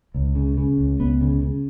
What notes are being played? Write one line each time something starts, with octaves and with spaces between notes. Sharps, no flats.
C#2
C#3
C#3
C#2
C#2 B3
C#3
C#3